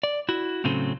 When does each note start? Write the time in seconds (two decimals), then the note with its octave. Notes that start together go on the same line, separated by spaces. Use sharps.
0.03 D5
0.29 E4 F#4
0.64 A2 C#3 F#3 C4 C#4 A4